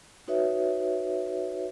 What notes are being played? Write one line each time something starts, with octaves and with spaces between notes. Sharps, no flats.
D#4 F#4 B4 C#5 E5